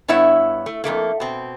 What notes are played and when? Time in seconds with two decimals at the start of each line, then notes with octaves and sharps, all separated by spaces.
0.08 G2 B3 E4 C#5 E5
0.66 A3
0.84 F2 B2 A3 A#3
1.20 B2 C4